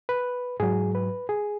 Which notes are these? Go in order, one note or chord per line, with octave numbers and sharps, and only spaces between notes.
B4
G#2 F#3 G#4
B4
G#4